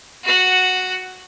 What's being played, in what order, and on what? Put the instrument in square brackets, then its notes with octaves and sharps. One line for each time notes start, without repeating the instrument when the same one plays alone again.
[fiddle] F#4 F#5